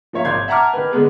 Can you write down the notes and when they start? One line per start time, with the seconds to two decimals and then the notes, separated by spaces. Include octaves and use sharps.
0.13 F3 A#3 C#5 E5 F5
0.25 G#1 D5 F5 C6 G#6
0.48 E5 F#5 A5 A#5 D6 F6
0.73 D#3 B4
0.91 D3 G#3 B3 G#4